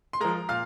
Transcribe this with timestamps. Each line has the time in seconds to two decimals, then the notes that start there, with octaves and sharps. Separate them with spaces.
0.13 C6
0.20 F3 G#3 A#4 A#5
0.49 A#2 F5 F6